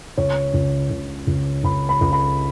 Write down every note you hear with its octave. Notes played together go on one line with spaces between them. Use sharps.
C#2 C#5
C#2
C#2
C#2
C#2 B5
B5
C#2
B5